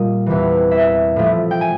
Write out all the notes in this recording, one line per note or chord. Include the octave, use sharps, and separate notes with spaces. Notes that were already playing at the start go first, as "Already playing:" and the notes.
Already playing: A#2 G3 A#3 D#5
E2 C3 E3
E5
A2 F3 A3
G5
G#5